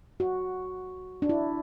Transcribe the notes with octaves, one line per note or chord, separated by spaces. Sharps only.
F#4
D4
E4